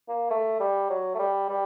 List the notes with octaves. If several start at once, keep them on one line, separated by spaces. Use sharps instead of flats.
A#3
A3
G3
F#3
A3
G3
G3